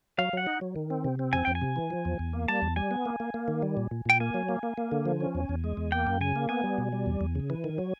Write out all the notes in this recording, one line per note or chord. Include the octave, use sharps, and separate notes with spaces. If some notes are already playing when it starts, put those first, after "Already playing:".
F#3 F5
F#3 F#5
D#4
F#3
D#3
C4
C3
C4
F2 G#5
F2 G5
G#5
C3
E3
F3
E2
E2
A#3
G3 A5
E2
G3 G#5
B3
A#3
A#3
A#3
D#3
G3
A#2
A#2
A#2 G5
A#3 G#5
F#3
A#3
A#3
A#3
D3
F3
C#4
E2
E2
G#3
E2
A#3 G5
F#2
C#3 G#5
A#3
B3 G#5
G3
B2
G3
E2
E2
C#3
E3
D#3
F#3